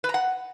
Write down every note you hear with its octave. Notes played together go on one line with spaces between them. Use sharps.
B4
A#5
F#5